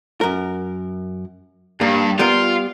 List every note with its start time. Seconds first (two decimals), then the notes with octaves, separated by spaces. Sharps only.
0.21 F#2 A#4
1.81 G2 A#3
2.19 G3 B3 F4 A#4